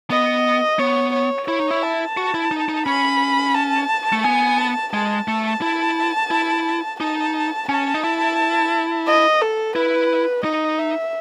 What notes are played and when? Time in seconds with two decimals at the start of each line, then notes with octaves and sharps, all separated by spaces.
0.10 B3 D#5
0.79 B3 C#5
1.13 C#5
1.48 E4 C#5
1.60 D#4
1.71 E4
1.83 A5
2.17 F#4
2.34 E4
2.51 D#4
2.69 D#4
2.86 C#4 B5
3.55 A5
4.13 A3
4.24 B3 G#5
4.58 A5
4.93 G#3 A5
5.28 A3
5.62 E4
6.31 E4
7.00 D#4 A5
7.69 C#4 A5
7.94 D#4
8.04 E4
9.07 D#5
9.41 A4
9.76 E4 B4
10.44 D#4 D#5
10.79 E5